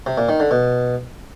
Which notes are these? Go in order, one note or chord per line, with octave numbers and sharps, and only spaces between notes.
C3
A#2
D#3
D3
B2